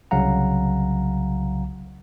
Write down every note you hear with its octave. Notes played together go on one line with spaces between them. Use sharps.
C2 C#3 F#3 F5 F#5 A#5